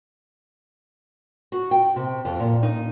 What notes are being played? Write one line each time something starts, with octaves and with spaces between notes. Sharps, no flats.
F#4
G5
C3
F2
A#2
D#4